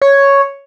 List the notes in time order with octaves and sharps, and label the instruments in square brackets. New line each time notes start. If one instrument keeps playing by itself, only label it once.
[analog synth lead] C#5